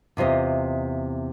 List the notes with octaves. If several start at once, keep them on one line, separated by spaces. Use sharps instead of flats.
E2 C3 F4 D#5